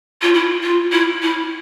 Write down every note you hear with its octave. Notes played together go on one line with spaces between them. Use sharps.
F4
E4
F4
E4
E4